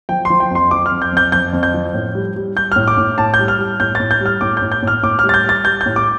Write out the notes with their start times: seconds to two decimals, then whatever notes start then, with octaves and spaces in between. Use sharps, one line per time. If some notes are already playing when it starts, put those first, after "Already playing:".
0.09 F3 G5
0.25 F3 C6
0.40 G5
0.51 F2 C6
0.71 F3 D6
0.86 F6
0.91 F2
1.02 G6
1.12 F2 G6
1.32 F2 G6
1.53 F2
1.63 G6
1.74 F3
1.94 A2
2.15 G3
2.36 G3
2.56 G3 G6
2.72 A2 F6
2.88 D6
2.98 A2
3.18 A2 A5
3.34 G6
3.39 G3
3.48 F6
3.59 G3
3.80 A2 G6
3.95 A2 A6
4.11 G6
4.21 G3 F6
4.41 A2 D6
4.57 G6
4.62 A2
4.72 G6
4.83 A2 F6
5.03 A2 D6
5.19 G3 F6
5.29 A6
5.34 G6
5.44 G3
5.49 A6
5.64 G3 G6
5.81 G6
5.86 A2
5.96 D6